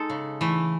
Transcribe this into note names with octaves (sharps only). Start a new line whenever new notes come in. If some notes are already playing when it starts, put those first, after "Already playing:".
Already playing: G#3 D#4 A4
C#3
E3 A3